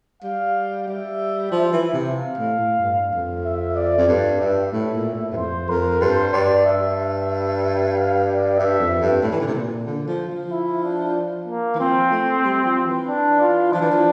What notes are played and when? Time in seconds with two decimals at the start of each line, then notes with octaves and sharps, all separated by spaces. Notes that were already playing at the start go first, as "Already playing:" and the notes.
0.23 G3 F5
0.87 G3 E5
1.51 F3
1.73 E3
1.94 C3
2.16 F5
2.38 A2
2.59 A2
2.80 G2
3.13 F2
3.45 E5
3.76 D5
3.98 F2
4.08 G2 D5
4.41 G2 E5
4.73 A2
4.95 A#2
5.15 A2
5.32 G2
5.37 F2 C5
5.69 F2 A#4
6.01 G2 C5
6.33 G2 D5
6.65 G2 E5
7.94 F5
8.27 D5
8.58 G2 E5
8.80 F2
9.01 G2
9.23 A2
9.32 E3
9.40 D3
9.47 C3
9.55 A#2
9.86 D3
10.08 F3
10.29 F3
10.51 E4
10.84 D4
11.47 A#3
11.75 E3
11.79 F3 C4
12.11 A3
12.45 G3
12.65 F3
12.87 E3
13.08 D4
13.40 F4
13.73 F3 D4
13.81 E3
13.92 F3